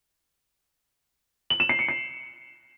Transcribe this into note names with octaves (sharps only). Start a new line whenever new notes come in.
F#7
E7
C7
C#7
C7